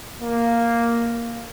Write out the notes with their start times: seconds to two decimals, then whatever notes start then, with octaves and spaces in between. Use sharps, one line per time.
0.21 A#3